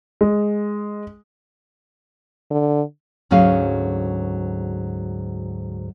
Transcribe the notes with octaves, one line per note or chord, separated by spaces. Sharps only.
G#3
D3
D2 G#2 F#3 C#4 G#4 F5